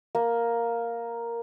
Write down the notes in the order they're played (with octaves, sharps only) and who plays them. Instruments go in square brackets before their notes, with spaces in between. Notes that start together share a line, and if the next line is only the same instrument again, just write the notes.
[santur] A#3